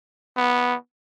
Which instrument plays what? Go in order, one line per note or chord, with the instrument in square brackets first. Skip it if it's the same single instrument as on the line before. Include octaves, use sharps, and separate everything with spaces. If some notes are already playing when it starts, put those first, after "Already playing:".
[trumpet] B3